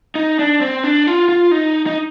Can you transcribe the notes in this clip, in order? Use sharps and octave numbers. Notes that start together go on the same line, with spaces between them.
D#4
D4
C4
D4
F4
F4
D#4
D#4